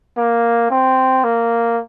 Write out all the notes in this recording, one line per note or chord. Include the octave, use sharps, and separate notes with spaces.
A#3
C4
A#3